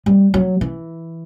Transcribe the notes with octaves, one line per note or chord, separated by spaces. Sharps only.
G3
F#3
E3